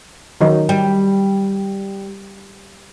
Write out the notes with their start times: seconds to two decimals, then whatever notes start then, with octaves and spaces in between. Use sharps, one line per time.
0.41 D#3 F#3 D#4
0.69 G3